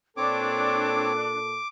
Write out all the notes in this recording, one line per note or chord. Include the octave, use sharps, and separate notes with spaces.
A#2 C4 D4 A4 C#5 D6